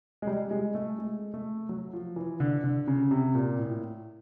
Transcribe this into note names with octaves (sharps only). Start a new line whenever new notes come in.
G#3
G3
G#3
A3
G#3
A3
F#3
F3
E3
D3
D3
C#3
C3
A#2
A2